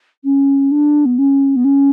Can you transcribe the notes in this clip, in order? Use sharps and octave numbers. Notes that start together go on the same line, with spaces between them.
C#4
D4
B3
C#4
B3
C#4